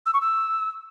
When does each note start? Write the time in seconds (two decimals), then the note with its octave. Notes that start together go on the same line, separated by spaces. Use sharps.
0.06 E6
0.14 C#6
0.21 E6